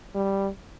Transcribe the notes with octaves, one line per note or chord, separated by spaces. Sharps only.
G3